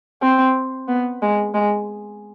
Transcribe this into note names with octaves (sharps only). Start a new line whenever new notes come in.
C4
B3
G#3
G#3